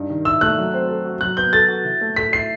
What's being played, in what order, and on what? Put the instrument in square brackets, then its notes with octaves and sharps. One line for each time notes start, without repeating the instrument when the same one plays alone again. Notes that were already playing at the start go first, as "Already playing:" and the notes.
Already playing: [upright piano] G2 D#4
D#3
[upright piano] E4 [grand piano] E6
[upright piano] A3 [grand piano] F#6
[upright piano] F#3
C4
A4
F#4
[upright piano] F#3 [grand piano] F#6
[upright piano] B3 [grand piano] G6
[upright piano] A4 [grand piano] A6
[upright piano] F#4
E3
A3
[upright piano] A4 [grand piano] B6
[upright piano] E4 [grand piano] C7